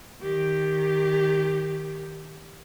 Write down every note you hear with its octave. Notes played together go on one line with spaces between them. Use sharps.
D#3 G4